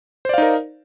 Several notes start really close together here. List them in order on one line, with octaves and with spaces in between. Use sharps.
C5 D5 F5 D#4 A#4